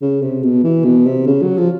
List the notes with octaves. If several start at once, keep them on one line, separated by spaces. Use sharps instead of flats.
C#3
C3
B2
E3
B2
C3
C#3
F#3
F3